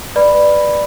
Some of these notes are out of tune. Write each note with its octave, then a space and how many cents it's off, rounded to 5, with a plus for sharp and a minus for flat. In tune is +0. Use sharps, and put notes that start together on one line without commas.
B4 +0 D5 +15 B5 +0